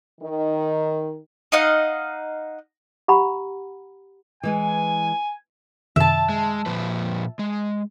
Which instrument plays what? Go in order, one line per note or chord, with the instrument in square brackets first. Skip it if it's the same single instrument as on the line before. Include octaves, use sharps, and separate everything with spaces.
[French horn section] D#3
[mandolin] D#4 D#5 F5 F#5
[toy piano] G4 F#5 A#5 B5
[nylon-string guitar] E3 G#3 B4 [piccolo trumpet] G#5
[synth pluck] F#2 C3 D#3 [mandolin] E5 A5
[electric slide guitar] G#3
A#2 F3 B4
G#3